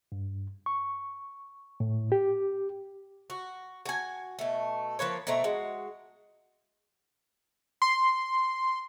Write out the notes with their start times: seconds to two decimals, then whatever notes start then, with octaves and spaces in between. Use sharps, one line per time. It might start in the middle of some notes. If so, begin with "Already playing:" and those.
0.12 G2
0.66 C#6
1.80 A2
2.12 G4
3.30 F#4
3.86 F#4 G#5
4.39 B2 A3
4.99 F3 A#3 B4 C#5
5.27 B2 A3 C4 A#5
5.44 G#3 F#4
7.82 C6